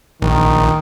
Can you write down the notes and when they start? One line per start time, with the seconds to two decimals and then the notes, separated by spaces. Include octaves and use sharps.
0.22 A#1 D#3